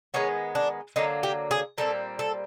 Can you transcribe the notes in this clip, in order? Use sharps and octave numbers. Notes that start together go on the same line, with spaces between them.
D#3 G#3 B3 C#4
D4
D3 F#3 A#3 D#4
G4
G#4
A#2 G3 C4 A4
A4